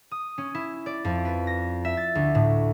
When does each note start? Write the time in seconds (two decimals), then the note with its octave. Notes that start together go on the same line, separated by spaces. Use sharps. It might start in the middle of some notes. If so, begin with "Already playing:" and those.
0.11 D#6
0.38 C#4
0.55 E4
0.86 D5
1.05 F2
1.25 B4
1.47 A#6
1.85 E5
1.97 A6
2.15 D2
2.35 A2